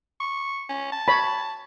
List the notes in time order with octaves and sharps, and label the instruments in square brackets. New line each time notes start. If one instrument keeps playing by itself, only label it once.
[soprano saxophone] C#6
C#4
A5
[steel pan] C#5 B5